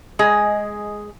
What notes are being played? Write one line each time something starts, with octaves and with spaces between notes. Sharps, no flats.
G#3 G#4 D#5